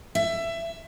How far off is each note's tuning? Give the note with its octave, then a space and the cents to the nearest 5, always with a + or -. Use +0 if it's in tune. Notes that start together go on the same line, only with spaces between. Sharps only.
E5 +20